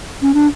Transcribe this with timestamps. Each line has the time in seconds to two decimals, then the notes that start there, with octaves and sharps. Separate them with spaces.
0.22 C#4
0.34 D4